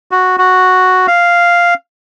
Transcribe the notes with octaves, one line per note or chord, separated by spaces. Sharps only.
F#4
F#4
F5